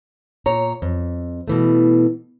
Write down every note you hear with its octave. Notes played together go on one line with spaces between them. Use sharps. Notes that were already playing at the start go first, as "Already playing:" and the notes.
A#2 C#5 A#5
F2
B2 E3 A3